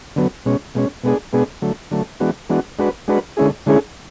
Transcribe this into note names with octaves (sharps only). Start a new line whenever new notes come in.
D3 F#3 B3
B2 G#3 C#4
B2 G#3 C#4
B2 G#3 B3 D4 G#4
B2 G#3 B3 D4 G#4
D3 F#3 A3
D3 F#3 A3
E3 G#3 B3 D4 F#4
E3 G#3 B3 D4 F#4
G#3 D4 F#4 B4
G#3 D4 F#4 B4
D3 G#3 C#4 E4 G#4
D3 G#3 C#4 E4 G#4